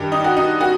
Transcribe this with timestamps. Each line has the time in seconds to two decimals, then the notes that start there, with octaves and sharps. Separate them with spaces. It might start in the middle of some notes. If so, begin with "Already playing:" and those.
Already playing: G2 D#3 G4
0.12 D#4
0.24 F#4
0.37 D#4
0.61 F#4